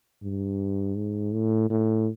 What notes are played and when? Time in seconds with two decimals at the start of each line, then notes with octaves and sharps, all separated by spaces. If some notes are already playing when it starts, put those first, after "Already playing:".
0.23 G2
0.97 G#2
1.33 A2
1.70 A2